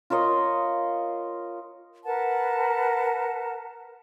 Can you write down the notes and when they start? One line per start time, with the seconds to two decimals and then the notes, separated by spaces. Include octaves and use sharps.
0.10 F4 A#4 C#5 D#5
2.06 A#4 B4 F#5 A5